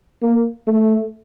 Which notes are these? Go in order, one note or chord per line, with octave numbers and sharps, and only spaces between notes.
A#3
A3